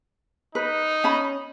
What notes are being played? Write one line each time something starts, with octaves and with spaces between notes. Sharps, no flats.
D#4 B4
C#4 B5